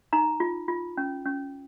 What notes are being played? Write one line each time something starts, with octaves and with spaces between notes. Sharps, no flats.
D#4 A#5
F4
F4
C#4
C#4